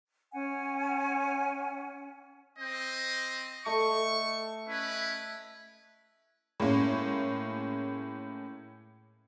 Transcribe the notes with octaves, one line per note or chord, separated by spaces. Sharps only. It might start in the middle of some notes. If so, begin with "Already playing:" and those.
C#4 F#5 G#5
C4 C5 D#5
A3 D#5 C#6
C#4 E4 B4
A2 G#3 A#3 C#4